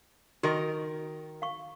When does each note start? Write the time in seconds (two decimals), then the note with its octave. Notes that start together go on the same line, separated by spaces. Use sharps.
0.43 D#3 F#4 A#4 D#5 C#6
1.42 F5 C#6